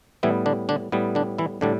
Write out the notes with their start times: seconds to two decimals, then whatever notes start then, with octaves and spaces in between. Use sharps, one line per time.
0.23 A2 E3 G3 B3 E4
0.46 D3 D4
0.69 D3 D4
0.92 A2 G3 B3
1.15 D3 D4
1.38 E3 E4
1.61 A2 D3 G3 D4